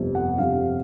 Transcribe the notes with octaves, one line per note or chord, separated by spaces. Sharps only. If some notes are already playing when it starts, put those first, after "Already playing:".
Already playing: G1 F2 C3
F#5
G1 F2 C3 F5